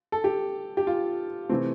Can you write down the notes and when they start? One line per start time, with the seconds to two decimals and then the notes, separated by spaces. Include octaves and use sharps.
0.12 A4
0.24 G4
0.77 G4
0.87 F4
1.49 C3 E3 A3 C4